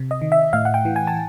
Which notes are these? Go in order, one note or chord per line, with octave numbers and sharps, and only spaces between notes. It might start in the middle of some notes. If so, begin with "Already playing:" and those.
Already playing: C3
D#5
D#3
E5
A2 F5
F#5
G5
E3
G#5
A5